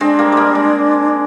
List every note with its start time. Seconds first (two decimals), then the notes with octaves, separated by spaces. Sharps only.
0.01 G#3 C4 D4
0.19 G3 A#3
0.32 G3 G#3 A#3
0.55 G#3